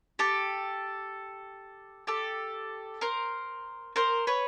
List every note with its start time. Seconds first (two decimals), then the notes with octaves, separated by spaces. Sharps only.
0.19 G4 A4
2.07 G4 A4
3.01 A#4 C5
3.96 A#4 C5
4.27 B4 C#5